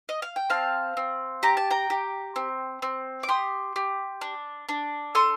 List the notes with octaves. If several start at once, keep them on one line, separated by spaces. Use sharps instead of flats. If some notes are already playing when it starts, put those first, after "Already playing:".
D#5
F5
G5
C4 F5 A5
C4
G4 A#5
A5
G5 A#5
G4
C4
C4
D6
G4 C6 D#6
G4
D4
D4
A4 C6 D#6